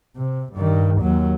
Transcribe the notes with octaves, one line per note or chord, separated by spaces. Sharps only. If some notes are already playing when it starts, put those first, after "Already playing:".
C3
G2 D#3
D#2 F#3